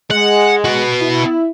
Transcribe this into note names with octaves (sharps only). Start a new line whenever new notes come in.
G#3 F#5
B3 F#4
E4